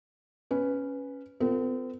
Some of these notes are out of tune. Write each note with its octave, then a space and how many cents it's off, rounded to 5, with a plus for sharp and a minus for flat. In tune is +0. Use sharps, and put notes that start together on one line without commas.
C#4 +0 B4 +0
C4 -40 F4 +0 A4 +45